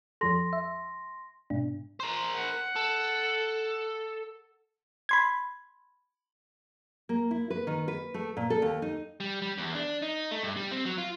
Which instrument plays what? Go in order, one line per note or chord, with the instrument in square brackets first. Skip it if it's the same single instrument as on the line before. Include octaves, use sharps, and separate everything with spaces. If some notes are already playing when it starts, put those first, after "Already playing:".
[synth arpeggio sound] F2 F3 A4 [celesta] C6 A#6
[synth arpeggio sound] E5
G#2 B2 D4
[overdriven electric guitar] A#4 C5
[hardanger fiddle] F#5
[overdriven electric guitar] A4
[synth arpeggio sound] B5 C6 G#6
[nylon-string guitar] A#3
E4
B4
D#3
B4
A3
A#2
A4
D#2
D#4
[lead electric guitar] G3
G3
E2
D4
D#4
A3
G2
G3
C4
F#3
F4